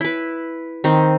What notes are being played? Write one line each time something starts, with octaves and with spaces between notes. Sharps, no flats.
E4 B4
D#3 C4